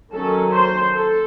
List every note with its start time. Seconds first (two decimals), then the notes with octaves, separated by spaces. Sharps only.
0.13 D#3 F#3 C#4 A4
0.53 C5
0.94 A4